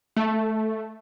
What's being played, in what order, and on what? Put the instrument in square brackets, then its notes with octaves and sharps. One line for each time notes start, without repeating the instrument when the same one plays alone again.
[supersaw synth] A3